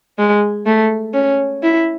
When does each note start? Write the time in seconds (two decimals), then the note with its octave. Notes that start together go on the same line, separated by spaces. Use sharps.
0.18 G#3
0.66 A3
1.14 C#4
1.63 E4